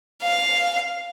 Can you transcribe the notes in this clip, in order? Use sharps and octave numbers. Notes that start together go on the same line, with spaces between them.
F5